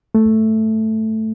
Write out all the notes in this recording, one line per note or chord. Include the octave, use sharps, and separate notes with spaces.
A3